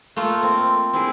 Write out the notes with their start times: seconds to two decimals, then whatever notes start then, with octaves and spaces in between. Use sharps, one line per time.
0.16 A3 A#3 F4
0.43 C4
0.93 C4 E4 G#4